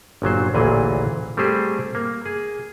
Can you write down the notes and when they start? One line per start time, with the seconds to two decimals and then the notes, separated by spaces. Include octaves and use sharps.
0.22 G1 A#2 F#3 C5
0.54 A1 D2 A#2 E3 G#4
1.37 G3 A3 C4 G4 G#4 C5
1.95 A#3
2.26 G#4